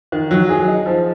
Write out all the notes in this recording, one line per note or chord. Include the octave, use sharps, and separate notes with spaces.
D#3
F#3
G#4
D#4
F3